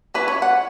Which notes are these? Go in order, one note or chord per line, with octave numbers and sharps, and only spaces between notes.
E3 C#4 E4 B4
C#5
F#5